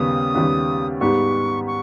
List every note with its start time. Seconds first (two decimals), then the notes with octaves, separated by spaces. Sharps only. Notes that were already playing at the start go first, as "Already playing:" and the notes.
Already playing: D#2 C#3 G3 B3 D#6
0.35 D#2 C#3 G3 B3
1.00 G#2 G3 B3 G4 C#6
1.67 C#6